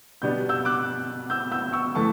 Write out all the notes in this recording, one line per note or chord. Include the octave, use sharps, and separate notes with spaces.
B2 G3 B3 D4 G6
E6 G6
D6 F#6
E6 G6
E6 G6
C#6 E6
E3 A3 A5 C#6